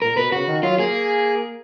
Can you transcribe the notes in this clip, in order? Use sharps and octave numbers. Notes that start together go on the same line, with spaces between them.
A#2 A#4
B2 B4
C#3 F#4
D#3
F#3 F4
A#3 G#4